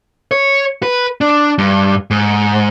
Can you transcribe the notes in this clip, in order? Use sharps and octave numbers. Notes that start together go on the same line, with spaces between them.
C#5
B4
D4
G2
G#2